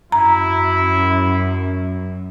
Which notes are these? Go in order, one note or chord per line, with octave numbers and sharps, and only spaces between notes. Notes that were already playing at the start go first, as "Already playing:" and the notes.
F#2 E4 A#5